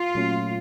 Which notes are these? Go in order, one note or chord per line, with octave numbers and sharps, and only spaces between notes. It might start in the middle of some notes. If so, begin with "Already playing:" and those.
Already playing: F4
A#2 F#3 A3 C#4